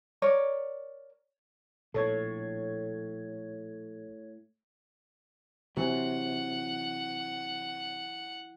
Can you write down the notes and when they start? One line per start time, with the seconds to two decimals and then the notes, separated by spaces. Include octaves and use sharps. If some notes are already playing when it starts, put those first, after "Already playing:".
0.22 A#4 C#5 D5
1.94 A#1 A2 A4 C#5 G#6
5.77 C3 E3 F#3 F#5